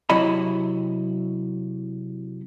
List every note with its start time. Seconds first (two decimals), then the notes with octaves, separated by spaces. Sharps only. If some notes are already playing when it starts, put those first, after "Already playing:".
0.10 C3 F#3 E4 D#5 B5